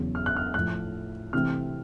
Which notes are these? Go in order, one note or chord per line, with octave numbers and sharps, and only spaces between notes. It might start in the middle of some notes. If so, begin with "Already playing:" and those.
Already playing: E2 C#3 F#3
F6
F#6
F6
A2 F3 A3 F#6
C3 E3 A3 C4 F6